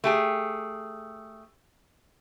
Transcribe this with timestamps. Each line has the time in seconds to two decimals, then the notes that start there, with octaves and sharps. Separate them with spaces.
0.04 A3 G4 G#4